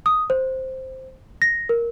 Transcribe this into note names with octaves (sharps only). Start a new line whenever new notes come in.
D#6
C5
A#6
A#4